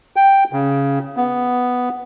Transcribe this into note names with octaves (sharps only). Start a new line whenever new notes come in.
G5
C#3
B3